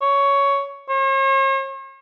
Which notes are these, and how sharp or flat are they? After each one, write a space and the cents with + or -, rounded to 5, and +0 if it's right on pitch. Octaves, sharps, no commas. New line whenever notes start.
C#5 +10
C#5 -45